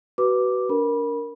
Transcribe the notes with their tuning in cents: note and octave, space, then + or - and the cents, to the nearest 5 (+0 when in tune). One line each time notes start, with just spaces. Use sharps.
F#4 +30 B4 +0 D6 +0
D4 -35 A#4 +0 B5 -20